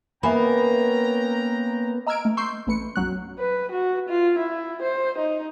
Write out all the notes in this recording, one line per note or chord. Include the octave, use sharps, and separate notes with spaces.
A#3 B3 C#4 E5 G5 G#5 A#5 B5
D#5 A#5 E6 F6 G#6 D7
A3
C6 C#6 E6 G6 C7
A1 A3 B4 C#7
B1 F#2 F#3 F#6
B4
F#4
F4
E4
C5
D#4